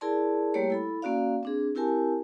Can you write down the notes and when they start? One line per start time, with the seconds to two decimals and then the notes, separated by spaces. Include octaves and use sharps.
0.01 E4 G#4 A#4 D5 A5 C6
0.54 G3 A3 A#3 G4 C#5
0.70 E4 A4 B5
1.02 A#3 C#4 F#4 D5 F5
1.43 C4 D4 G#4
1.75 C4 E4 G4 A#4 G#5 A5